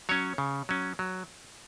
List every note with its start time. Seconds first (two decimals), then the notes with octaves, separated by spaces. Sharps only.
0.09 F#3 C#4 C#5
0.38 C#3
0.69 F#3 C#4
0.99 F#3